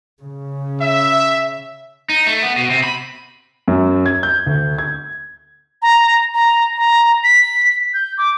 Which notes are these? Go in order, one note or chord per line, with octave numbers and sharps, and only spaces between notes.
C#3
E5
D#4
A3
B3
B2
C3
B5
F#2
G#6
G6
D2
G#6
A#5
A#5
A#5
B6
G6
D6